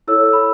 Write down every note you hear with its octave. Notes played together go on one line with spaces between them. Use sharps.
E4 A4 C#5 E6
B5